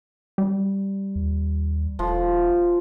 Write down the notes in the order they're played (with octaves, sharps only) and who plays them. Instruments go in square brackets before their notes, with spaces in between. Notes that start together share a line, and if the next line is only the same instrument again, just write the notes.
[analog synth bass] G3
[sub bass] D#2
[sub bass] D#1 [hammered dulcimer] F3